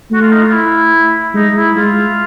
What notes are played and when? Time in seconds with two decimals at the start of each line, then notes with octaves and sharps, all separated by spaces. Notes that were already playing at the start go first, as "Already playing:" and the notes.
0.11 A3 F#4
0.21 F4
0.31 D#4
0.42 F4
0.52 E4
1.35 G#3 D#4
1.56 E4
1.76 G#3 F4